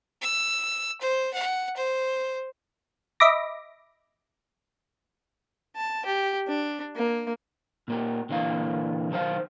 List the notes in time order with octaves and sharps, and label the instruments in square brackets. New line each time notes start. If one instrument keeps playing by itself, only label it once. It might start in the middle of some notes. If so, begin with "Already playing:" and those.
[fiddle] E6
C5
F#5
C5
[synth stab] D#5 E5 B5 D6 A#6
[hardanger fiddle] A5
G4
D4
A#3
[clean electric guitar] A#2 A#3 G4
A#2 D3 E3 A#3 F5
B1 D#3 A4 C5 F5